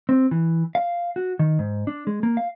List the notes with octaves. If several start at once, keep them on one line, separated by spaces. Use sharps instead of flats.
C4
E3
F5
F#4
D#3
G#2
D4
G#3
A#3
F5